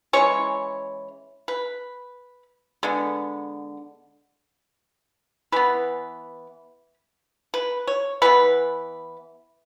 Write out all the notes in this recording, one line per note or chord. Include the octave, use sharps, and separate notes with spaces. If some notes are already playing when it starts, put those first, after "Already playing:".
E3 G#3 C#4 C#5
B4
D3 G#3 B3
E3 B3 B4
B4
C#5
E3 B3 B4